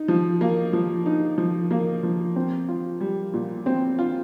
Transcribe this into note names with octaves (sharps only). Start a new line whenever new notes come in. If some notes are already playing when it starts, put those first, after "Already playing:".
Already playing: D#4
F3
A#3
F3
D#4
F3
A#3
F3
C4
F4
G3
A#2
C4
F4